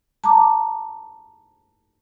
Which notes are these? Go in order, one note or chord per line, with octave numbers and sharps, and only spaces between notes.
A5 A#5 D6